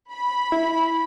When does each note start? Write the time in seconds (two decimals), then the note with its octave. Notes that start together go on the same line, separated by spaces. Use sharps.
0.13 B5
0.52 E4